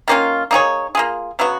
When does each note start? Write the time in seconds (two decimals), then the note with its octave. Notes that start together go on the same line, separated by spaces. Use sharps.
0.08 D#3 A#3 C#4 F4
0.51 A#3 D#4 G#4 C#5
0.95 A#3 F4 G#4
1.39 C#3 F#3 B3 F#4